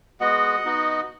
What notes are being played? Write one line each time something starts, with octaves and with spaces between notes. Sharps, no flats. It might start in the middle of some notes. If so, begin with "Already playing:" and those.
G#3 B3 F#4 D#5 F#5
B3 D#4 F#4